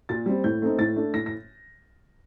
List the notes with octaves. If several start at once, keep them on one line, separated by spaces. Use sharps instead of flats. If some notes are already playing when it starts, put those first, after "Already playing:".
A#2 A6
G3 C4
A2 G6
A3 C4 D#4
A2 A6
A3 D4
A2 A#6
A#6